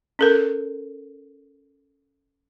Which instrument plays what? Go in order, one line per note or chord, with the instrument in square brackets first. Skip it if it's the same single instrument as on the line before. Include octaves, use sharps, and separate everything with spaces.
[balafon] C#4 A4 A#4